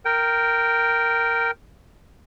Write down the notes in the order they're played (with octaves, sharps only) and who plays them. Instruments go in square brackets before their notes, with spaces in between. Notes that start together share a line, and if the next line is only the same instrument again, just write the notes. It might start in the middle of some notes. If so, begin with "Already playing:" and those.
[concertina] A#4 G5